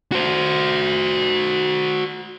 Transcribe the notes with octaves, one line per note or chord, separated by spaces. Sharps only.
F#4 C5